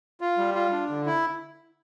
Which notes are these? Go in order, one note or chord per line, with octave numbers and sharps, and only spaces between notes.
F4
G3
F4
D4
D3
E4